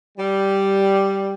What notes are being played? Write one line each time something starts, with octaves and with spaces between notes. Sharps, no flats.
G3